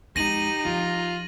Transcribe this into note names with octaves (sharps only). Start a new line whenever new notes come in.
F2 G#3 D#4 G4 A#6 D#7 F#7
F3 F4